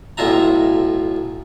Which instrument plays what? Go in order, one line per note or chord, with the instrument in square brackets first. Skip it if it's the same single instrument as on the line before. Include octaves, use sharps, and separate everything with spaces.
[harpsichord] B1 A2 C#4 F4 E5 A#5